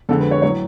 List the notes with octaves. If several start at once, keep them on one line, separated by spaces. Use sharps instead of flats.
F2 D3 G#3 A4
B4
C#5
A2 F#3 C#5